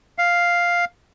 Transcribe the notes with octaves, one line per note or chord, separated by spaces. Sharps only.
F5